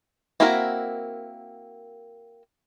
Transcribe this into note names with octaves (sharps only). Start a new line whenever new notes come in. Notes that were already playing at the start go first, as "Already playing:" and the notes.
A#3 C4 E4 F#4 A#4